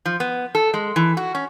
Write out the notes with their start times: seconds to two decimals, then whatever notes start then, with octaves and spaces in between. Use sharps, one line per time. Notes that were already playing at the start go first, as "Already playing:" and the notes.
0.05 F3
0.20 B3
0.55 A4
0.74 G#3
0.96 E3
1.17 F#4
1.35 C#4